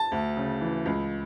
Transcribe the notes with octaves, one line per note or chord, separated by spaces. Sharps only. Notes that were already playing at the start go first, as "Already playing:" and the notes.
Already playing: A5
D2
C#3
E3
C#2